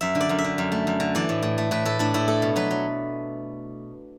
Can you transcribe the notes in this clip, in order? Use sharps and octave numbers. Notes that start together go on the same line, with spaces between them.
F#2 E5
D3
D5
F#2
E5
D3
F#2
A3
F#2
D3
E3 D5
A2
A2
A3
A2 B4
A2 A4
A2 D4
A2 E4
A3 A4
B2
F#3 B4
F#3